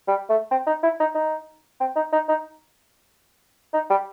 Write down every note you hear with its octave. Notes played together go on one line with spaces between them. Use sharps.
G3
A3
C4
D#4
E4
D#4
D#4
C4
D#4
D#4
D#4
D#4
G3